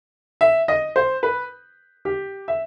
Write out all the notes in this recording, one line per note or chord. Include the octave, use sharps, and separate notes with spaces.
E5
D#5
C5
B4
G4
E5